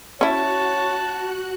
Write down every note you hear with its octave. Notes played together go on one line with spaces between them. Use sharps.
C#4 E4 F#4 C#5 A5 F#6